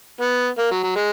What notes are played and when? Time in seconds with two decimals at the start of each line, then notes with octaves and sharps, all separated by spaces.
0.21 B3
0.59 A#3
0.71 F#3
0.83 F#3
0.96 G#3